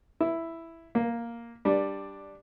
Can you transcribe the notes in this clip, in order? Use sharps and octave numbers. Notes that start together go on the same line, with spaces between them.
E4
A#3
G3 D4